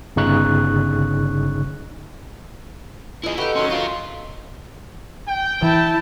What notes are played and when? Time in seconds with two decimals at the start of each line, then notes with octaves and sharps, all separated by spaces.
0.16 G1 C#3 D#4 C#6 F#6
3.23 B3 E4 F4 G#4 D#5
3.38 D#4 F#4 G4 A4 B4
3.55 D#3 F#3 C#4 C6
3.71 F4 A#4 F5
5.27 G5
5.62 E3 E4 A5